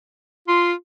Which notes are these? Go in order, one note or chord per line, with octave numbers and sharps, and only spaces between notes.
F4 C6